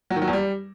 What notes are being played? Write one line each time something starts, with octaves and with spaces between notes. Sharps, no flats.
F#3
D#3
F#3
E2
G3